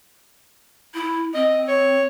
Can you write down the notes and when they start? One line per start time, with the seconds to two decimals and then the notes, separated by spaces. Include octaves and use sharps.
0.94 E4
1.34 C4 D#5
1.68 C#5